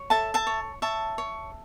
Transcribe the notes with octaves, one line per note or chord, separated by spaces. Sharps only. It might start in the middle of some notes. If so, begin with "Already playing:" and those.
Already playing: C#5
A4 E5 A5
E5 A5
C#5
C#5 E5 A5
C#5